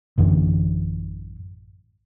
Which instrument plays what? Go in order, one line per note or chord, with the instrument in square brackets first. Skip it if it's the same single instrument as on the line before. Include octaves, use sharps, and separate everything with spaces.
[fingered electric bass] A1 F#2 D3 E3